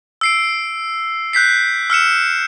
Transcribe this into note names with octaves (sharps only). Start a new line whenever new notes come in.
E6 C7 D7
F#6 G6 B6 C7
E6 F6 C#7 E7